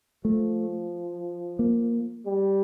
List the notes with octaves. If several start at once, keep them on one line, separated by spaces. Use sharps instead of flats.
F3 A3
A#3
G3